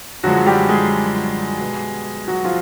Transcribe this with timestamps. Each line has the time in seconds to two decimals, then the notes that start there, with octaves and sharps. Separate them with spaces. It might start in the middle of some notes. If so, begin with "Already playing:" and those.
0.23 F#2 D3 F3 F#3 G#3 F#4
0.46 G3 G4
0.69 G#3 G#4
1.60 B2 G3
2.28 F#3 F#4
2.45 F3 F4